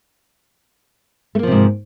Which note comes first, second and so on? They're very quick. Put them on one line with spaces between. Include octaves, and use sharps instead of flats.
A3 A#3 F3 C3 G#2